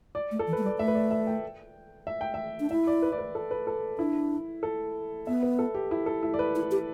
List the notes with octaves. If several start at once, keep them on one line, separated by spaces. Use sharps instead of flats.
D5
A3
A4
E3
A3 B4
G3
D5
A3 E5
B4
D5
E5
G5
E5
G5
E5
D4
E4 E5
D5
B4
D5
B4
A4
B4
A4
D4 E4
A4
B3 E5
B4
A4
G4
E4
A4
E4
D5
B4
E4
G4